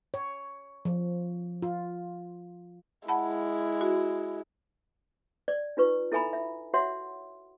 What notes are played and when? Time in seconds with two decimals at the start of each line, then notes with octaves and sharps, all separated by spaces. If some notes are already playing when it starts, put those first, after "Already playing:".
0.14 C#5
0.85 F3
1.62 F4
3.08 G#3 E4 F#5 A5 B5
3.81 F#4
5.48 D5
5.77 D#4 F4 B4 C#6
6.12 E4 A4 E5 G#5 A#5 B5
6.33 E5
6.74 F#4 C#5 E5 F#5 C6